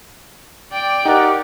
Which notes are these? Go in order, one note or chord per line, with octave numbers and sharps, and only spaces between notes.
D5 G5
D#4 G4 A#4 F#5